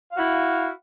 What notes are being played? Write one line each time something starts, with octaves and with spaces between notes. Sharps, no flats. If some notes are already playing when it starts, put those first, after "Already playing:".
E4 F#4 F5